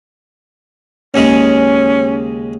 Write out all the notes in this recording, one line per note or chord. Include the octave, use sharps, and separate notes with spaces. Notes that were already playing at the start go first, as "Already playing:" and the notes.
D#2 C#3 G#3 C#4